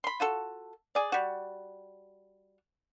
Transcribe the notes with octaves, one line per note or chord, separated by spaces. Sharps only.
B5 C6
F4 F#4 A4
G#4 D5
G3 F#4